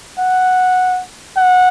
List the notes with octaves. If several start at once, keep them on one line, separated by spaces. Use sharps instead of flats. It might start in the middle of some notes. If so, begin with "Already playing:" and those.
F#5
F#5